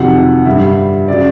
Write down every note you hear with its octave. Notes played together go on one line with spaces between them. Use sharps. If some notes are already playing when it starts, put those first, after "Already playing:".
Already playing: F2 C3 D#3 F#3 F#5
G2 D3 G3 E5
C#3 F#3 D5